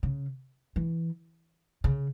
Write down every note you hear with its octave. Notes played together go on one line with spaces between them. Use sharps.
C#3
E3
C#3